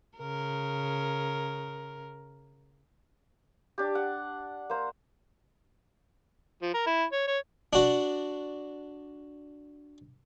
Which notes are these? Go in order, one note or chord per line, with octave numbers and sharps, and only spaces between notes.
C#3 A#4
D4 G4
F#5
A#3 C5
F3
A#4
E4
C#5
C#5
D4 F#4